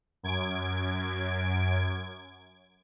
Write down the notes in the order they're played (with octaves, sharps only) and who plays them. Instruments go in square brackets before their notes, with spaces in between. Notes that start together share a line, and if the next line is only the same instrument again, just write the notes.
[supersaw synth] F#2 G#6 D7